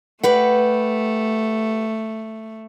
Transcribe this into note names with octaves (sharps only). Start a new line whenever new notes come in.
A3 G4 B4 F#5